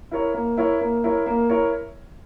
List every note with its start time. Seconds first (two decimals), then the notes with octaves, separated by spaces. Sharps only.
0.11 E4 A#4 C#5
0.34 A#3
0.57 E4 A#4 C#5
0.81 A#3
1.04 E4 A#4 C#5
1.26 A#3
1.49 E4 A#4 C#5